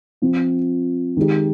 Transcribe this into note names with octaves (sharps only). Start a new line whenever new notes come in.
F3 C4 F4
D#3 G#3 D#4 G4